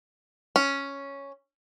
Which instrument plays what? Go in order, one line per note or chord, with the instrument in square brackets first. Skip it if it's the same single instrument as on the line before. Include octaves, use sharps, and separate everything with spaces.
[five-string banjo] C#4